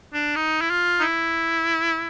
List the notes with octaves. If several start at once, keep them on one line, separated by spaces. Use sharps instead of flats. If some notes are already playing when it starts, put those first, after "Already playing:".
D4
D#4
E4
F4
D#4
E4